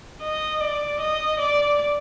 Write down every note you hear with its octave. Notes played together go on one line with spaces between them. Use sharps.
D#5
D5
D#5
D5